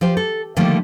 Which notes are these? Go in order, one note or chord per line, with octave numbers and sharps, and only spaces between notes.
F3 G4 C5
A4
D3 D#3 F3 G3 A3 A#3